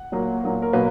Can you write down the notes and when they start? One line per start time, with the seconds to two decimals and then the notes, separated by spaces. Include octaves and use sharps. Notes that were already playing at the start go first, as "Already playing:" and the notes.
Already playing: F#5
0.12 A#2 F#3 A#3
0.44 A#2 F#3 A#3
0.62 A#4
0.73 B2 F#3 A#3 B4